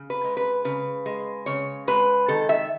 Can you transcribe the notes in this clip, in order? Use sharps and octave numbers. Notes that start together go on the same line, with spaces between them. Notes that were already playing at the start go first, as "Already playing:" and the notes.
Already playing: C#3
B4
G#3
B4
C#3 B4
G#3
C#3 C#5
G#3 B4
D#3 A4
E5